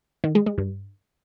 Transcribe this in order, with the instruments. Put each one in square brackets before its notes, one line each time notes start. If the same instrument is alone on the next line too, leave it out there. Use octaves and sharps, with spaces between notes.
[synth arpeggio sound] D#3
G#3
G#3
G2